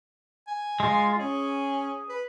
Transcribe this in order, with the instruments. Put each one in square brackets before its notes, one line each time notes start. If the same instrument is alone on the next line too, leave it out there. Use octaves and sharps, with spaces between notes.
[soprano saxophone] G#5
[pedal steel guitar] G#3 F4
[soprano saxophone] C#4 [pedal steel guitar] G#4
[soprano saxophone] B4